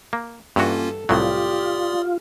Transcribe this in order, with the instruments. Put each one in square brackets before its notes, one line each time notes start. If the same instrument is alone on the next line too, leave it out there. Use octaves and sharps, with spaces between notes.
[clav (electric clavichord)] A#3
[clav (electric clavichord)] G2 E3 F#4 [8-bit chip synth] A#3 C#4 F4 [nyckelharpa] A4
[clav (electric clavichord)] C2 A2 F#3 [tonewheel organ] F4 [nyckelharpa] G4 [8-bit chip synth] D5 C6 D#6